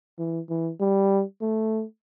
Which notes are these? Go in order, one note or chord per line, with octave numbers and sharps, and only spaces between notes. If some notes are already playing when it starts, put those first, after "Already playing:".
E3
E3
G3
A3